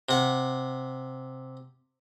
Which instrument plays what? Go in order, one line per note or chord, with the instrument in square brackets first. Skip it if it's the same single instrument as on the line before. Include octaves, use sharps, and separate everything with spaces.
[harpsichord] C3 F#5